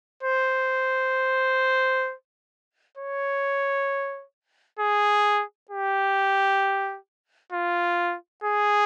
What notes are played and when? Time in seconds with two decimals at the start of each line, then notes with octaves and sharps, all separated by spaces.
0.23 C5
2.97 C#5
4.79 G#4
5.70 G4
7.52 F4
8.44 G#4